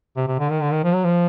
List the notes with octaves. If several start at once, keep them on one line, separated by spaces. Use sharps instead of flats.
C3
C3
D3
D#3
D3
D#3
F3
F#3
F3